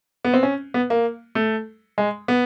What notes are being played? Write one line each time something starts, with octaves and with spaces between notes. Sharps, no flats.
B3
C4
C#4
B3
A#3
A3
G#3
B3